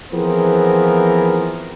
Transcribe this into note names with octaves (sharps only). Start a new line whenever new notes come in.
E3 F3 B3 C4 G#4 A#4